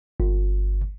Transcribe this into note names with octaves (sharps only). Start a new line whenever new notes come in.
G1